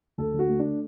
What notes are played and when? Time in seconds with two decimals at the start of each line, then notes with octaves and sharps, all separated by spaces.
0.18 D2 A4
0.34 D3
0.39 F#4
0.49 A3
0.59 D4